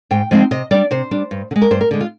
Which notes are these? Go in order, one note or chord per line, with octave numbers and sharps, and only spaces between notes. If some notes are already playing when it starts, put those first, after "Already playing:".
G#2 G5
F3 G#3 C4 D#4
C3 D#5
G3 D4 D5
C3 C5
G3 D4
G2
D3
G#3
A#4
G2 C5
A#4
D3 G#3
F4